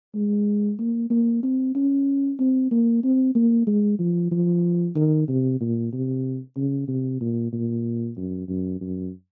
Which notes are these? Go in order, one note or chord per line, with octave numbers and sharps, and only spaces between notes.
G#3
A#3
A#3
C4
C#4
C4
A#3
C4
A#3
G#3
F3
F3
D#3
C3
A#2
C3
C#3
C3
A#2
A#2
F#2
F#2
F#2